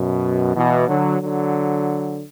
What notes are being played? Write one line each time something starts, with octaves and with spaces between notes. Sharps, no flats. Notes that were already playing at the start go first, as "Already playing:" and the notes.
Already playing: F#2 B2
B2 E3
D3 F#3
D3 F#3